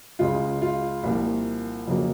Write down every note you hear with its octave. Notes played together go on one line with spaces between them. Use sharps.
C#2 C#3 G#3 F4
F4
C2 A#2 F3 A#3
F2 C#3 F#3 A#3